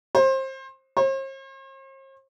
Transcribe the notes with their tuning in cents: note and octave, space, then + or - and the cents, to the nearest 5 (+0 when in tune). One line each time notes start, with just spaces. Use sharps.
C5 +25
C5 +45